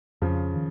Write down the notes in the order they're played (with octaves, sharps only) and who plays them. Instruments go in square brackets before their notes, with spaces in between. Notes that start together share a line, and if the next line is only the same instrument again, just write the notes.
[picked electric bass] F2 [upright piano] C#3 F3
[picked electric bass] D#3